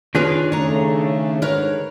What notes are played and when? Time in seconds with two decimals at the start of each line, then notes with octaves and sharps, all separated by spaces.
0.15 D#3 D4 F4 G#4 B4 C#5
0.52 C#3 A3 C#4 C#5 A#5
1.42 G#2 D3 A#4 B4 C#5